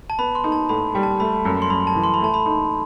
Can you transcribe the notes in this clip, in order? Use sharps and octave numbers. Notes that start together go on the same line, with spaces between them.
A5
B3 B5
C6
D#4
A5
A2 B5
G3
A5
A3 B5
F#2
C6
F#2 B5
A5
E3
C6
B5
A3 A5
B5
D#4